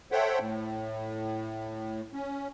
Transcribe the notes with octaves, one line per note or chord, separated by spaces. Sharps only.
A4 C5 C#5 E5 F#5 G5
A2
C#4